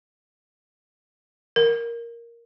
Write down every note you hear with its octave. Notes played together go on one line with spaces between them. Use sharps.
A#4